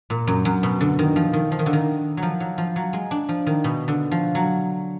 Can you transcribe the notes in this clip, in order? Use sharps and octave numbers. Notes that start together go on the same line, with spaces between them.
A#2
F#2
F#2
B2
D3
D#3
F3
D#3
F3
D#3
D3
D#3
F#3
F3
F#3
F3
F#3
G#3
D4
F3
D#3
B2
D3
F3
F#3